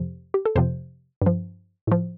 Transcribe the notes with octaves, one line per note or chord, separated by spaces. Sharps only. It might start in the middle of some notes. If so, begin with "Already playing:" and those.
Already playing: F2 C3 F3
G4
A4
F2 C3 F3 C5
G2 F3
A2 F3